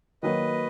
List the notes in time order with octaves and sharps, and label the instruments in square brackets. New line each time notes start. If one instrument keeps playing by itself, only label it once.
[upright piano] D#3 F#3 A#3 D#4 F#4 [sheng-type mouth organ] B4 D#5